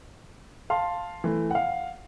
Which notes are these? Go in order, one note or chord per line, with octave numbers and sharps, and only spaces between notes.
F5 A5 C6
E3 A3
F5 F#5